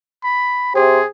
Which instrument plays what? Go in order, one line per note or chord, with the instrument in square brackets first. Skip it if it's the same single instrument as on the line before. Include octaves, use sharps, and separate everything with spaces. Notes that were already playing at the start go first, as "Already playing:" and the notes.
[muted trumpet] B5
[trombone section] C3 G4 C5 [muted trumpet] G#4